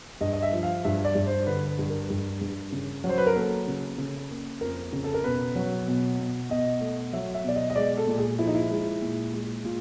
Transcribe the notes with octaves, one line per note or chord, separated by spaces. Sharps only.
G2 D#5
D#5
E5
F3
F5
G2 E5
D5
G2
C5
D3 B4
B4
G2
A#4
G2
G2
C#3
F#3
C5
B4
A#4
A#3 A4
C#3
C#3
A#3
F2 A#4
C#3
A4
A#4
B2 B4
F#3
B2
B2
B2 D#5
A3
F#3 E5
E5
B2 D5
D#5
D#5
G#3 D5
A4
A#2
G#4
F3 E4
D#4
E4
G#3
A#2
G#3
A#2 F4